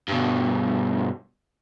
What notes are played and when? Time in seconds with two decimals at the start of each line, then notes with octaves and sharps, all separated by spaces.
0.08 G2 B2